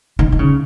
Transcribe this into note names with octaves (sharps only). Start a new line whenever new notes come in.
D#3
D#3
C#3